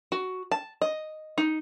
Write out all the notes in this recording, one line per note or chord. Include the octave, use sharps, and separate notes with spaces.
F#4
A5
D#5
D#4